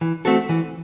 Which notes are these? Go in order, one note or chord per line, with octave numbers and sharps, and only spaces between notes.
E3
A3 C4 F#4 A4
E3